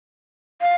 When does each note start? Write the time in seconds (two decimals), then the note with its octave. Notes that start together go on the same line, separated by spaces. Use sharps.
0.61 F5